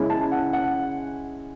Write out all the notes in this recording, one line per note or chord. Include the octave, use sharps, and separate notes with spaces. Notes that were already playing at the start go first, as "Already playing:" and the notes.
Already playing: C#3 G#3 C#4 E4
A5
F#5
F#5